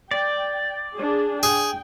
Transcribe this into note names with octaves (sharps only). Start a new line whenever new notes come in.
D5 G5
D4 G#4
G#4 G5